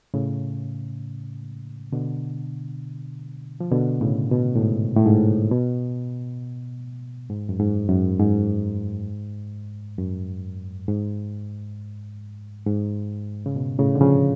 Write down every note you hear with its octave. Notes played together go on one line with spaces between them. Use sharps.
A2 C#3
B2 D3
F3
B2 D3
A2 C#3
B2
A2
G#2
A2
G#2
B2
G#2
F#2
G#2
F#2
G#2
F#2
G#2
G#2
C#3
B2
A2 C#3
D3
C#3 F3